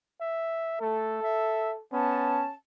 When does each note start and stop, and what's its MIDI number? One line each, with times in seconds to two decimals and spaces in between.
0.20 0.81 76
0.81 1.18 57
0.81 1.81 69
1.23 1.73 76
1.92 2.45 59
1.92 2.53 61
1.92 2.55 81